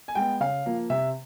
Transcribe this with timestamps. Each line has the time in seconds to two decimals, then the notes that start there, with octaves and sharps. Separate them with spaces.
0.08 G#5
0.15 G#3 B3 G5
0.41 C#3 F5
0.66 F3 A#3
0.90 C3 E5